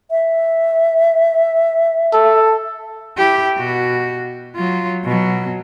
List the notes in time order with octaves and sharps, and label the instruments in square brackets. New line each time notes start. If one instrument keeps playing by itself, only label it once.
[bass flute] E5
[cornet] A4
[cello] E4 G4
B2 F#4
F#3 F4
B2 F#3